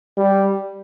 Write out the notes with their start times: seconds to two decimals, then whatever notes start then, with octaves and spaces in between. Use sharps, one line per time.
0.17 G3